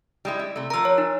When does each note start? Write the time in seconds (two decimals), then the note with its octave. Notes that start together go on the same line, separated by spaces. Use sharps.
0.25 G3 G#3 E4
0.39 E4
0.56 C3 A3
0.70 F3 A#4 A#5 E6
0.85 C#5
0.98 D#4